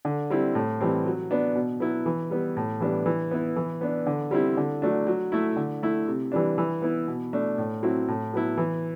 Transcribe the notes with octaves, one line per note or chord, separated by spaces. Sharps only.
D3
G3 C4 E4
A2
E3 G3 C4
F#3
B3 D4
B2
F#3 B3 E4
E3
G3 B3
A2
E3 G3 B3 D4
E3
B3 E4
E3
B3 D4
D3
G3 C4 E4
D3
F#3 A3 D4
F#3
A3 E4
D3
A3 E4
C3
E3 G3 D4
E3
B3 E4
B2
A3 D4
A2
F#3 C4 E4
A2
F#3 B3 E4
E3